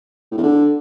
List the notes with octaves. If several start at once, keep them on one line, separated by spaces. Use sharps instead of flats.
A2
E2
D3